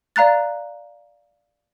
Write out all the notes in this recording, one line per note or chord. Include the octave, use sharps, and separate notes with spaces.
D5 F5 A#5 F#6 A6